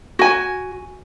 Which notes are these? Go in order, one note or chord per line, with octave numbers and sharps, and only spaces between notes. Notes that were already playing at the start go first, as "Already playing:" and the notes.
F#4 G#5